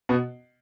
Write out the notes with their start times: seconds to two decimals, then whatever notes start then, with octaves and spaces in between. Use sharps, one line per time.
0.09 B2 B3